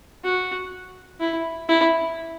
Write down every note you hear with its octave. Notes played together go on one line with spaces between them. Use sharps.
F#4
E4
E4